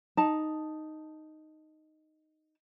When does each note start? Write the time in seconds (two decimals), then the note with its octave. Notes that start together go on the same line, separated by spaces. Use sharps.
0.17 D#4 A5